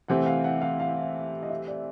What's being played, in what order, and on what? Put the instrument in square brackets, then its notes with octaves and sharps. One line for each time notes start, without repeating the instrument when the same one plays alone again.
[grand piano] C3 E3 A3 C4 E4 [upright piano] F#5
[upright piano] F5
F#5
F5
F5
D#5
E5
D5